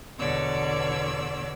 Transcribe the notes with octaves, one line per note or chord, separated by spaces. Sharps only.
E2 B2 D3 C#5 D5 E6